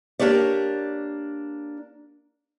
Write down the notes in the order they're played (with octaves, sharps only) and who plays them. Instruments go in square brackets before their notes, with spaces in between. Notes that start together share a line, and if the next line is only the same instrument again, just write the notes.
[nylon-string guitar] A#3 D4 G4 C#5 D5